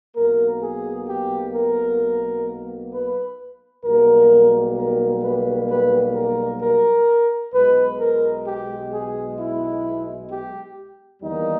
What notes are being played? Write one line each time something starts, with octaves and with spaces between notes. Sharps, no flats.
B1 B2 A#3 A#4
G#4
G4
A#4
B4
B1 B2 G3 A#3 A#4
A#4
B4
B4
A#4
A#4
B1 B2 G#3 B4
A#4
G4
G#4
E4
G4
E2 D#3 G3 A#3 D#4